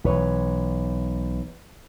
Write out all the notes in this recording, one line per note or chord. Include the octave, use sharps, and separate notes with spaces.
B1 E3 B4 C#5